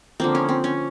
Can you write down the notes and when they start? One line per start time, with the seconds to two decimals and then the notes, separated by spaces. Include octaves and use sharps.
0.20 D3 F3 A#3 C4
0.35 C#4
0.49 C4
0.64 C#4